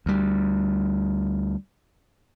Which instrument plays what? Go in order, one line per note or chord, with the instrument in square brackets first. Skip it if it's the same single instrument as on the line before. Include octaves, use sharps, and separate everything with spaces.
[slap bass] D2 G3